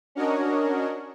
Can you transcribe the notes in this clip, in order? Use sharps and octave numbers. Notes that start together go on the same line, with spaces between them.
C#4 D4 F#4 A#4 C#5 D#5